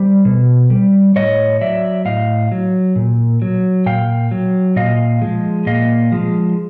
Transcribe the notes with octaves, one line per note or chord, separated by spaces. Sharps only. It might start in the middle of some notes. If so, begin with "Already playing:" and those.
Already playing: G3 C5
B2
G3
A2 C#5 D#5
F#3 D5 E5
A2 D#5 F5
F#3
A#2
F#3
A#2 F5 G5
F#3
A#2 D#5 F5
F3 G#3
A#2 D#5 F5
F3 G#3